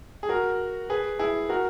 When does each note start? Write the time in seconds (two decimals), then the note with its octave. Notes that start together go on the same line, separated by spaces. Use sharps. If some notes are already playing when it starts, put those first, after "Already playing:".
0.23 G#4
0.29 F#4 A#4
0.90 G#4 B4
1.19 E4 G#4
1.49 F#4 A#4